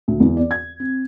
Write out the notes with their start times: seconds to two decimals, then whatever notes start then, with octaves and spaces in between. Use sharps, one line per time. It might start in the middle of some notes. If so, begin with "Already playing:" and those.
0.08 D2
0.20 E2
0.37 D5
0.51 G#6
0.80 C4